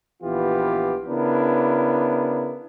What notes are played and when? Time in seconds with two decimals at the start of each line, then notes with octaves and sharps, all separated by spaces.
0.23 A#1 E3 B3 F4 G4
1.07 C#3 B3 D4 E4 A#4